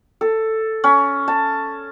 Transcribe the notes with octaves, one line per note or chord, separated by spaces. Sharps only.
A4
C#4
A5